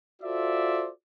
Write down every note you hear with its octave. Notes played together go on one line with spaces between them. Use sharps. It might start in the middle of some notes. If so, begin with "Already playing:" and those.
F4 F#4 A4 C5 D5 E5